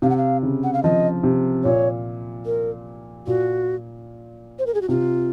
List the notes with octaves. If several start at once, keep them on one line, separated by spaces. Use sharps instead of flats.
C3 F5
F#5
F5
C#3
F#5
F5
F3 D#5
C3
A#2 C#5
A#4
A#2 F#4
C5
A#4
G#4
F#4
C3 F4